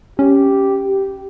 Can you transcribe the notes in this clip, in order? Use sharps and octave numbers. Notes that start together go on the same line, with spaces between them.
C#4 G4
G4